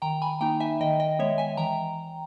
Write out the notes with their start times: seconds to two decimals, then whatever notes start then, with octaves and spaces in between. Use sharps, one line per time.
0.02 D#3 G5 A#5
0.22 G#5 B5
0.41 A#3 D#4 G5 A#5
0.60 E5 G#5
0.81 D#3 D#5 G5
1.00 D#5 G5
1.19 G#3 B3 C#5 E5
1.38 E5 G#5
1.57 E3 G5 A#5